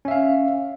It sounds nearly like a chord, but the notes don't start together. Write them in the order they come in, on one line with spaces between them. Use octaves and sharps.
C#4 E5 F5